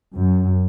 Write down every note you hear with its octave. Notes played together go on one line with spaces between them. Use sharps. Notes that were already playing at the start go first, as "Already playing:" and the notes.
F#2